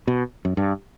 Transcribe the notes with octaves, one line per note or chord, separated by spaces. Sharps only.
B2
F#2
G2